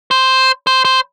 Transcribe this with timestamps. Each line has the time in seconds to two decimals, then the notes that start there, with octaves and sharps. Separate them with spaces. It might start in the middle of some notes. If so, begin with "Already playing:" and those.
0.11 C5
0.67 C5
0.85 C5